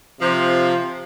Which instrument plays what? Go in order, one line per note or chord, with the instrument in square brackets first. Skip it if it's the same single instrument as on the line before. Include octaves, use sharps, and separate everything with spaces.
[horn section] C3 F3